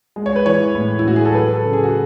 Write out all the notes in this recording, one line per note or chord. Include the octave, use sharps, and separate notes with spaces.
G#3
C#5
B4
E3 C#5
A2
E4
A2 F#4
G#4
A4
F#3 B4
A4
C#3
G#4
F#4